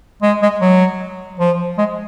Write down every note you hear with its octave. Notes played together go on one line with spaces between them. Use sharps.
G#3
G#3
F#3
F3
G#3